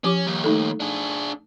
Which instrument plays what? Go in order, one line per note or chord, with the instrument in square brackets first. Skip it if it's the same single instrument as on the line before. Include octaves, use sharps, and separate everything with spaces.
[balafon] F3 G4 D6 [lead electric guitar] C#4
[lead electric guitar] D#2 G3
[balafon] A3 D#4 A4
[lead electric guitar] D4 G#4